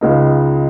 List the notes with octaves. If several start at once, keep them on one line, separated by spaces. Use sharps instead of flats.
C#2 C#3 G#3 D#4